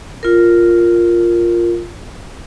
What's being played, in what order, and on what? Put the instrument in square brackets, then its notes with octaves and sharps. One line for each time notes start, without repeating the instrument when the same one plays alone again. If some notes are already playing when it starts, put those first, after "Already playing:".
[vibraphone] F4 A#4